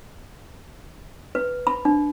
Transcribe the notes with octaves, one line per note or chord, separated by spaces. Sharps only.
B4
B5
D4